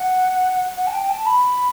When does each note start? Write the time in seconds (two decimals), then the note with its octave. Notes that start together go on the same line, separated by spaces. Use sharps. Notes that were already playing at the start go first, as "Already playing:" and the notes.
Already playing: F#5
0.76 F#5
0.87 A5
0.92 G5
1.09 A5
1.26 B5